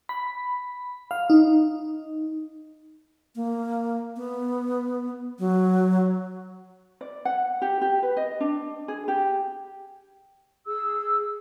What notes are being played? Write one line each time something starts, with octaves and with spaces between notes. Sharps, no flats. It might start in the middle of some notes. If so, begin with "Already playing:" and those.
B5
F5
D#4
A#3
B3
F#3
D5
F#5
G4
G4
B4
D#5
D4
G#4
G4
G#4 E6